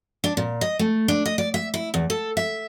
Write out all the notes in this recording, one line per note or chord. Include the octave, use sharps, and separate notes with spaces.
D4
A#2
D#5
A3
D4
D#5
D5
E5
E4
E2
A4
E5